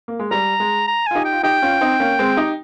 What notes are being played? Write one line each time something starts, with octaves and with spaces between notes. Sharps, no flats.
A#3
G#3
G3 A#5
G#3
A#5
F4 G#5
D#4 G4
G5
F4
D#4 G4 G5
C#4 F4
C4 D#4
A#3 C#4
G#3 C4
D#4 G4